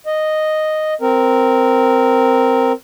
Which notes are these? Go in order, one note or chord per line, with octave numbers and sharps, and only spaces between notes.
D#5
C4 A#4